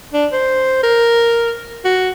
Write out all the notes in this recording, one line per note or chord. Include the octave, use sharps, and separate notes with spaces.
D4
C5
A#4
F#4